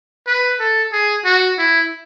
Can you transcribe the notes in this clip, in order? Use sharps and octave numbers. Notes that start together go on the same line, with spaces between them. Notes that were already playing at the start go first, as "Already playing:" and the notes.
B4
A4
G#4
F#4
E4